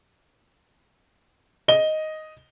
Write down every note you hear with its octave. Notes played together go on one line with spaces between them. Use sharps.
D#5 G7